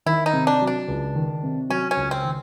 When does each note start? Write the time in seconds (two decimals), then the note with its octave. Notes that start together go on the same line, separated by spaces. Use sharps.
0.06 D#3 E4
0.26 D#4
0.33 C3
0.47 D4
0.61 F#3
0.67 D4
0.88 C#2
1.15 D#3
1.43 C3
1.69 F#3 C#4
1.91 C#4
1.97 C#2
2.11 C4
2.24 D#3